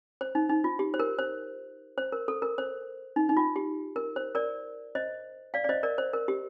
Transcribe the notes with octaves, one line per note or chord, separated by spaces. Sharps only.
C5
D#4
D#4
F4
G4
C5
A#4
C5
C5
A#4
A4
A#4
C5
D#4
D#4
F4
G4
A#4
C5
A#4 D5
C5 D#5
D5 F5
D5
C5 D#5
A#4 D5
C5
A#4
G4